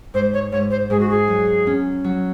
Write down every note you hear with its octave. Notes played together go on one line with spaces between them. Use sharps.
G#2 C5
C#5
G#2 C#5
C5
G#2 G#4
F#4
G#4
F#3
C#4
F#3